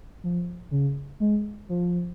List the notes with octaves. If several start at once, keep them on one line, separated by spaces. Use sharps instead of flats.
F3
C#3
G#3
F3